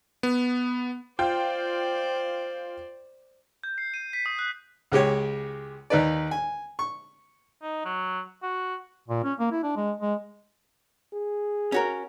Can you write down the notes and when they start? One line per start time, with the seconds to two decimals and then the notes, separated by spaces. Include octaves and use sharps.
0.23 B3
1.19 F4 C5 D5 G5
3.64 G6
3.78 C7
3.94 D#7
4.13 B6
4.26 D#6
4.39 F#6
4.92 C#2 G#3 G4 C#5
5.90 D#2 D#4 B4 D5
6.31 G#5
6.79 C#6
7.63 D#4
7.85 F#3
8.43 F#4
9.08 A#2
9.24 C#4
9.40 A#3
9.52 E4
9.64 D4
9.77 G#3
10.01 G#3
11.15 G#4
11.72 C#4 F#4 A#4